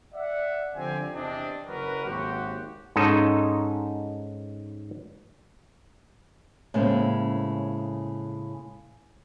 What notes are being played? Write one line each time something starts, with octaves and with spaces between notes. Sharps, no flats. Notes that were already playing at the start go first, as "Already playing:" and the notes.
D5 E5 F#5
D3 F3 C4 G4 G#5
E2 C3 C4 D4 D#5
F#1 F#2 F#4 A#4 B4
G#1 D#2 F#4 G4 C5 F#5
G#2 C#4 D#4 A4 D#5
A2 C#3 G#3 A#3 C4 C#4